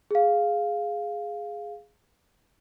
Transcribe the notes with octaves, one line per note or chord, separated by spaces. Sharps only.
G#4 F5